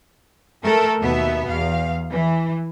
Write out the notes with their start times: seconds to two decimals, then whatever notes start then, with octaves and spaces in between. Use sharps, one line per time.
0.63 A3 A4 A#4
1.00 D#2 B2 B3 E5
1.48 E2 F5
2.10 E3